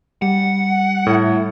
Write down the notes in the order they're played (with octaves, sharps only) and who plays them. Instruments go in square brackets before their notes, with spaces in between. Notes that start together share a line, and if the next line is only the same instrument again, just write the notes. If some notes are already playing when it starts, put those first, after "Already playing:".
[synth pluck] G3 [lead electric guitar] F#5
[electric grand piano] A2 [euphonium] E4